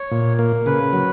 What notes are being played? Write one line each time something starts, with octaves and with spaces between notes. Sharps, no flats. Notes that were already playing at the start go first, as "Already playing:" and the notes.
Already playing: C#5
A#2
A#3
C#3 B4
F#3